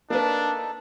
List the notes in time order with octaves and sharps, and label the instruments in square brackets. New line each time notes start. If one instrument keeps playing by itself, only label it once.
[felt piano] A#3 B4 [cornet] D4 [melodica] D#4 A4 A5